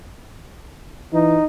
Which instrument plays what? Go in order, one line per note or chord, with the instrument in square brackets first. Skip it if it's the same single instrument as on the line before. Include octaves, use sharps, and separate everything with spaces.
[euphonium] E3 [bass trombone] D#4